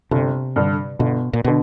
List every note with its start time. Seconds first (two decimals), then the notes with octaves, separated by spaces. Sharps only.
0.11 G1 C3
0.56 G2 D3
0.99 G1 B2
1.33 A#2
1.45 B2 D3